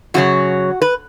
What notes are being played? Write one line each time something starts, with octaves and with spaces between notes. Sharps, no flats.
F#2 C#3 F#3 F#4
B4